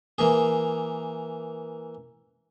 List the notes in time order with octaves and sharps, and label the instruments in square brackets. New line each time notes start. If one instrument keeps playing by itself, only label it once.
[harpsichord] E3 A#3 G#4